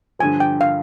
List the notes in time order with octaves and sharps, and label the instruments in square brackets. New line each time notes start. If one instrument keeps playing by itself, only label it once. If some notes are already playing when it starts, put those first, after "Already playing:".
[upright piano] G2 D3 F3 [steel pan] G#5
[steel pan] G5
F5